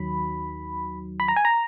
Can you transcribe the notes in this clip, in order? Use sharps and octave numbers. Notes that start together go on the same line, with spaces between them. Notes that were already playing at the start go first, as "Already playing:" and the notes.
Already playing: D#2 D#3 F#3 B5
B5
A#5
G#5
A#5